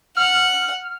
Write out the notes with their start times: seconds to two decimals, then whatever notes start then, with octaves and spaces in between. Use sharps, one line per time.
0.17 F#5 F6